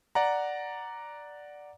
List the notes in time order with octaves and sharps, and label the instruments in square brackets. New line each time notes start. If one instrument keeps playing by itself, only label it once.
[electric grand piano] D5 F#5 A#5